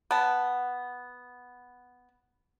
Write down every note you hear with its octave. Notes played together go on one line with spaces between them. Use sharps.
B3 A5